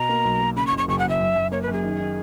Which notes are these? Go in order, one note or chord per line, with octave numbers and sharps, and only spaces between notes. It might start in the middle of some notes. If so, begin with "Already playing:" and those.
Already playing: B2 A#5
A#3
B1
A#3
C#3 B5
C#6
F#1
C#6
F#1 C#6
F#5
F#1 E5
F#2
F#2
A#3 C#5
B4
F#2
G#4
D#3
D#3